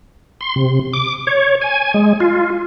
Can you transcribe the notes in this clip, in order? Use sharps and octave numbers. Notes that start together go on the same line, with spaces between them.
C6
C3
D6
C#5
G#5
G#3
F4